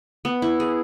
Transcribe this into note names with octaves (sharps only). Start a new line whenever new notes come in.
B3
E4
G#4